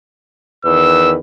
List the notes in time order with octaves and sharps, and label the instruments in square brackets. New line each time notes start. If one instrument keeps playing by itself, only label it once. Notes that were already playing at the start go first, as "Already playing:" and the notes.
[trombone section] E2 D#3 B4 [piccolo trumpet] E6